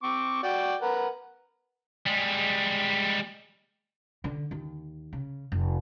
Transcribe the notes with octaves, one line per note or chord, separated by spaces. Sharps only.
C4 C#6 D6
F#4 D5 G5
A#4 B4 F#5
G3 G#3
D3
D#2
C#3
F1